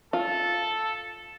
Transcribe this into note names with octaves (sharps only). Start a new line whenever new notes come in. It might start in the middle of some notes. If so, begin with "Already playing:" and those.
F4 A4